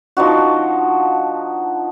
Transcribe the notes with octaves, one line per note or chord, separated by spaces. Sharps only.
F3 D4 D#4 F#4